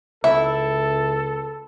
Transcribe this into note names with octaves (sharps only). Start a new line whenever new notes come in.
C#2 E4 A4 E5